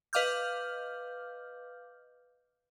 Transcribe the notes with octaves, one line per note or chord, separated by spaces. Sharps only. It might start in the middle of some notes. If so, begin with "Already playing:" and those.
B4 D#5 F5 D6 F6 G6